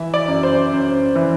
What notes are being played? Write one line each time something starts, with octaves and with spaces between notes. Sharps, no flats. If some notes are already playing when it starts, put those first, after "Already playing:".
Already playing: E3 E5
D5
F#2
C5
F#2
E3